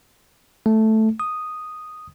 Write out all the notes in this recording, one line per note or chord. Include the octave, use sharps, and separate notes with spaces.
A3
D#6